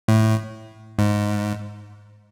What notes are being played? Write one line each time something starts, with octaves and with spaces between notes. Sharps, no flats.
A2
G#2